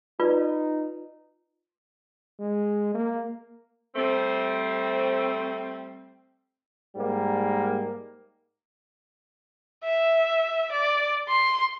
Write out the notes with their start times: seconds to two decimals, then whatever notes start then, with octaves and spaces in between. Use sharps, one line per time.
0.20 D#4 F4 B4 D5
2.40 G#3
2.94 A#3
3.95 G3 A3 C4
6.96 G#2 G3 A#3
9.84 E5
10.72 D5
11.29 C6